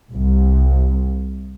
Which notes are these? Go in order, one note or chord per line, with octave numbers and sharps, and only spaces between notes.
C2